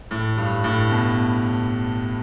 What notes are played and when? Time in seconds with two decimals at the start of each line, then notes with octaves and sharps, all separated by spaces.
0.11 A2
0.37 G2
0.64 A2
0.91 B2